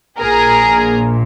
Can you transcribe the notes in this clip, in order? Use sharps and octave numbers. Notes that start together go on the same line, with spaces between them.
A#1 A#2 G#4 A#4